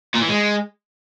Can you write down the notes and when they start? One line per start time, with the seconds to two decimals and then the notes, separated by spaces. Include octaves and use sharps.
0.15 A#2
0.22 E3
0.29 G#3